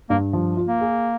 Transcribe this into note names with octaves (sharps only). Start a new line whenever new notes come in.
G2 A#3
F3
F4
A#3
G#4